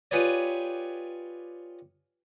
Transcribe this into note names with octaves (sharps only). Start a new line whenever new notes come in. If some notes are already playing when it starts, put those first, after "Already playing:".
F4 G4 G#4 B4 C#5 D5